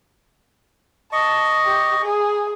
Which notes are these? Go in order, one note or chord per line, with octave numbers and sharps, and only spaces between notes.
D#5 A5 C#6
G4
G#4